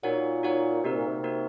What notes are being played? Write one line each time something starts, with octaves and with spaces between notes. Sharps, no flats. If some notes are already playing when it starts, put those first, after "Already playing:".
A#2 D#4 F#4 C#5 F#5
D#4 F#4 C#5 F#5
C3 A#3 D#4 F#4 A#4
A#2
C3
A#3 D#4 F#4 A#4